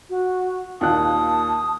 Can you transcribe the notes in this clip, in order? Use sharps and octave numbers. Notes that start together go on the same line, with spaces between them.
F#4
D#2 A#2 A5 D#6 F#6